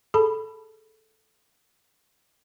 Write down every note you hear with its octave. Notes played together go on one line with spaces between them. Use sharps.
G#4 A4 A5 B5